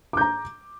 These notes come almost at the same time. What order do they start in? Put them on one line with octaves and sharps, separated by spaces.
D6 G6 A#5